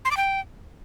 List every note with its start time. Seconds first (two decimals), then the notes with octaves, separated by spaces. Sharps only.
0.05 C6
0.11 D6
0.17 G5